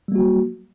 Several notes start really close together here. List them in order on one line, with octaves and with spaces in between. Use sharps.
G3 A#3 F#4 F#3